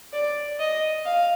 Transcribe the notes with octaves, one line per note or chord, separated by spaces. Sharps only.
D5
D#5
F5